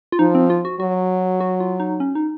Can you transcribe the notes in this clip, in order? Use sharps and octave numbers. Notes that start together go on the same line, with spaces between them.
F4
F3 D#4
C4
F4
F#4
F#3 F#4
F#4
F4
D#4
C#4
D#4